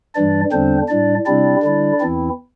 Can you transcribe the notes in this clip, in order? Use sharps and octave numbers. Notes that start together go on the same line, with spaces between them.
G2 E3 G3 D4 D5
E2 D3 G3 C4 D4 C5
A2 G3 D4 D5
C3 G3 C4 D4 E4 D5
D3 G3 E4
E2 E3 C4 E4